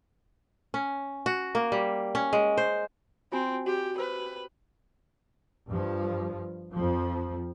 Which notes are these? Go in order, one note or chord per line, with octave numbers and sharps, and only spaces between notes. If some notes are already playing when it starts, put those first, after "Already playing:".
C#4
F#4
A#3
G3
C#4
G#3
C5
C4 F4 F#4 G#5
F#4 G4
B4 C5 E6
G2 F3
F2 F3